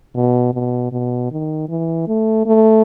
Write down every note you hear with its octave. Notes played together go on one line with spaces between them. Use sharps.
B2
B2
B2
D#3
E3
A3
A3